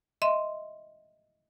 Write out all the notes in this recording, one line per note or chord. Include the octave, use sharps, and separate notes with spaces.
D#5 E5 C6